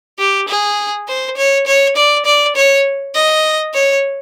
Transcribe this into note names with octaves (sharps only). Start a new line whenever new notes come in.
G4
G#4
C5
C#5
C#5
D5
D5
C#5
D#5
C#5